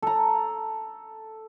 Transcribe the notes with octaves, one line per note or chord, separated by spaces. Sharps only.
A4 A#5